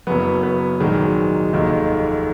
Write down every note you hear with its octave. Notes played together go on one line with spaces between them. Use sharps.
F#1 F#2 C#3 F#3 B3
B3
A#1 G#2 D#3 F#3 G#3
F1 D#2 D#3